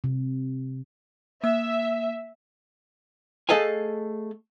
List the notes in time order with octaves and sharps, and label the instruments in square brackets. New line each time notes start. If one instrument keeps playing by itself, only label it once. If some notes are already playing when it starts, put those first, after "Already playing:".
[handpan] C3
[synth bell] A#3 E6 [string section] E5
[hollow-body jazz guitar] A3 G#4 A4 D#5 F5 G#5